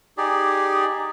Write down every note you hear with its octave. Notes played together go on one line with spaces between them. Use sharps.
D#4 G4 G#4 D5